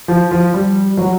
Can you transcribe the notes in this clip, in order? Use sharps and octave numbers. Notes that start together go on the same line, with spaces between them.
F3
F3
G3
F#3